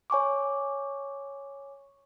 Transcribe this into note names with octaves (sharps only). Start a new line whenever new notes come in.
C#5 G#5 C#6 D6